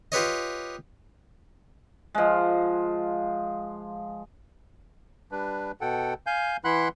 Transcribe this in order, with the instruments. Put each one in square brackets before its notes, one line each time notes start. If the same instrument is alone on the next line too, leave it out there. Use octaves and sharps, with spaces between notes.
[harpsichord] F4 G4 B4 C#5 D#5
[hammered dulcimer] F3 G#3
[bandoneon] G3 D4 B4
B2 A4 F#5 G5
F5 G#5 G6
E3 E4 F#5 B5 C6 F#6